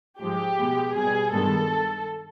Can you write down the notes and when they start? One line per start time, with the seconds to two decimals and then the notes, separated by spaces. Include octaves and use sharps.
0.20 G#2 F3 G#3 G4
0.57 B2 G#3 B3
0.95 B2 G3 B3 G#4
1.32 G2 D#3 G#3 B3 A4